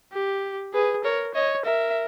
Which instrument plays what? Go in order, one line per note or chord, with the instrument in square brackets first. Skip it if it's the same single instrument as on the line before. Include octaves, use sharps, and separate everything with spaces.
[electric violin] G4
[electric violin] G#4 [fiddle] B4
[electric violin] A#4 [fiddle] C#5
[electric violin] C#5 [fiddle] D#5
[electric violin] A#4 [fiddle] E5